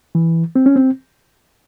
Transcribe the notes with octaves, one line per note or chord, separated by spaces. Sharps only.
E3
C4
C#4
C4